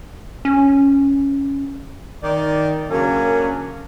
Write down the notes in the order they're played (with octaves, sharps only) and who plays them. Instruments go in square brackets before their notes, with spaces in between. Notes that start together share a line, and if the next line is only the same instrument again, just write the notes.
[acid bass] C#4
[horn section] D#3 D5
C#3 F#3 A#3 C#4 D4 A#4